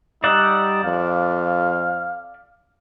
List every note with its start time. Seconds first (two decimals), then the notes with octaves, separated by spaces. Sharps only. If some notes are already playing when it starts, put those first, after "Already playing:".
0.24 G3 D#4 D5 E5 F#5
0.84 F2 F5